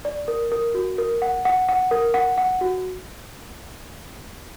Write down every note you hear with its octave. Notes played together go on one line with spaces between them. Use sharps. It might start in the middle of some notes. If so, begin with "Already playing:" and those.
D5
A#4
A#4
F#4
A#4
F#5
F#5
F#5
A#4
F#5
F#5
F#4